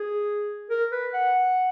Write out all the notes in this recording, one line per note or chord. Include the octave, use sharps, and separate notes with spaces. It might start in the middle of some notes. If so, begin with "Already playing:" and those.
Already playing: G#4
A#4
B4
F#5